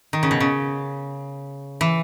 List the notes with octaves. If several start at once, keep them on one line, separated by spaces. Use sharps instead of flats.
D#3
C#3
B2
C#3
E3